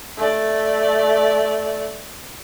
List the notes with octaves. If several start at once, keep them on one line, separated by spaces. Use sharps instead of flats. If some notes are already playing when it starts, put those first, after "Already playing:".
A3 D5